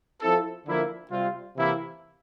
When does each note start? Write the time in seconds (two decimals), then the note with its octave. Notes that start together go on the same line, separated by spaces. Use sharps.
0.22 F3 C4 E4 A4
0.66 D3 F3 A#3 E4 A#4
1.11 C3 G3 C4 F4
1.56 C3 E3 A#3 E4